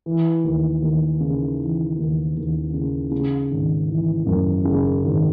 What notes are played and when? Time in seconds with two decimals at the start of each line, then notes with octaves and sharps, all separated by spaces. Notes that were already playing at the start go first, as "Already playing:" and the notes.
0.06 E3
0.44 D#2
0.82 D#2
1.21 C#3
1.59 E3
1.97 D#2
2.36 D#2
2.74 C#3
3.11 C#3
3.51 G#1
3.88 E3
4.26 F#2
4.65 C#3
5.04 G#1